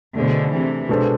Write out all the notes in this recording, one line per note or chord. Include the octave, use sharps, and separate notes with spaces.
B2 D3 A3 D4 G#4 C5
C3 E3
B2 G#3 D4 A4 C5